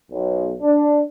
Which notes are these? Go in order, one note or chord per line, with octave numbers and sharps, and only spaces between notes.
B1
D4